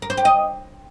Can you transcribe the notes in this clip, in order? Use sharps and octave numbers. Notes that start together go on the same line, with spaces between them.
A#4
C5
G4
D#5